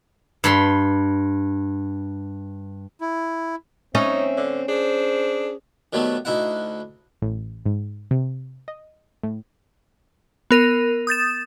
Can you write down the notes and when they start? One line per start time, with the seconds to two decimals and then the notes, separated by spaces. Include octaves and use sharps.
0.44 G2 B5 C6
3.01 E4
3.95 C4 C#4 D#4 E5
4.37 D3
4.69 D4 G#4 C5
5.93 D#3 F#3 G3 A3 B3
6.25 D2 D#4 E4 F#5
7.22 A1
7.66 G#2
8.11 C3
8.68 D#5
9.23 A2
10.51 B3 A#4 D#7
11.07 D#6 G6 A6 E7